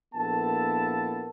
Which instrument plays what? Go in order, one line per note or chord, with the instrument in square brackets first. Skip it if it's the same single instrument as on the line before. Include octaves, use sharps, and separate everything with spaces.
[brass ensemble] A#1 A#3 B3 E4 A4 A5